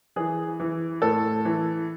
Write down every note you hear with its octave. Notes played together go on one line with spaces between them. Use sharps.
E3 G#4
E3
A2 A4
E3